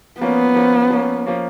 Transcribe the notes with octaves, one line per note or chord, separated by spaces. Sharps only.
F3 A#3 B3 C#4
F3 A#3 C#4
F3 A#3 C#4
F3 A#3 C#4